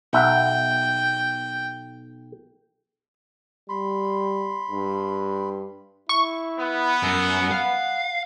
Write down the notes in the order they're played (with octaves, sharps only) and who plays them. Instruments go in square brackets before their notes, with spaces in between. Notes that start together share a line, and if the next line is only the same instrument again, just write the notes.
[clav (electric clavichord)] B1 E5 F#5 [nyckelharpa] G5
[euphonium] G3 [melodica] B5 C6
[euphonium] G2
[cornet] E4 [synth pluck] C#6
[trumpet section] B3
[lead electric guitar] F#2
[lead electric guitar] F5 [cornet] F#5